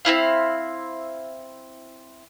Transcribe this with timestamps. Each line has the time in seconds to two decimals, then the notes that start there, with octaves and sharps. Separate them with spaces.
0.05 C4 C#4 E4 F5